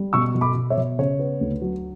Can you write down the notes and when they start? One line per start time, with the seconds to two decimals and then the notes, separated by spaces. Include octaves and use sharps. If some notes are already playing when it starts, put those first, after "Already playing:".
Already playing: G3
0.13 B2 C#6 E6
0.35 B2
0.41 B5 D6
0.55 B2
0.70 C#5 E5
0.77 B2
0.99 C#3 C#5
1.19 B3
1.41 D2
1.62 F#3